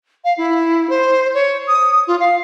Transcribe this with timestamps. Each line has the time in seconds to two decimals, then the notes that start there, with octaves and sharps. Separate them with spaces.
0.25 F5
0.38 E4
0.90 C5
1.34 C#5
1.67 D#6
2.07 F4
2.20 F5